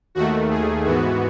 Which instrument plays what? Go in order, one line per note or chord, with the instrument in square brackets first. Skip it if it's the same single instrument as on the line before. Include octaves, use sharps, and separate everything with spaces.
[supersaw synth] D#2 D#3 A3 F#4
G#4
G#2 E3 B3 F#4